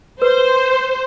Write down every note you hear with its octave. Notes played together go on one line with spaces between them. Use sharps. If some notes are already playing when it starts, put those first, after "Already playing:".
B4 C5